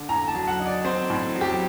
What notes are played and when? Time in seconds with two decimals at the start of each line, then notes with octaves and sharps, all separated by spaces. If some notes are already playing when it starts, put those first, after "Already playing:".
Already playing: D3
0.09 A2 A#5
0.28 A5
0.35 F#3
0.47 F#5
0.60 D#4
0.66 D5
0.85 C4 C5
1.10 A2
1.35 F#3
1.41 G4